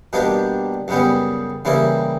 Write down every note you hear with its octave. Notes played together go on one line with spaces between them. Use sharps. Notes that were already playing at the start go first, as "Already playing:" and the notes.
B2 G3 A#3 D4 G4
F#2 C#3 G3 B3
C#3 E3 G3 A#3 E4